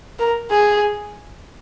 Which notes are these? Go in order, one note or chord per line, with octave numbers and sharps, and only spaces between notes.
A#4
G#4